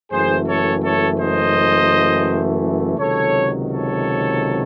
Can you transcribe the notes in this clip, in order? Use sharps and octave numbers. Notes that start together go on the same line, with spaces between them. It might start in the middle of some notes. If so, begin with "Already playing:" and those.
F#1 F#2 E3 A3 G#4 C5
A4 C#5
A4 C#5
C5 D#5
C#2 C3 D#3 F#3 A4 C#5
A4 C#5